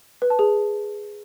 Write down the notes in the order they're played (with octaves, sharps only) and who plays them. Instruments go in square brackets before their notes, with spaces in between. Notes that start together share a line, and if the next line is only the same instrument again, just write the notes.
[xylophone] B4
A5
G#4